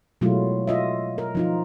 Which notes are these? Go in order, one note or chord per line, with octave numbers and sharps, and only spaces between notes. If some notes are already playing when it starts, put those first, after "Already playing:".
B2 F#3 G#3 A3 E4 F4
F4 D#5 E5
A#4
F3 D#4 F4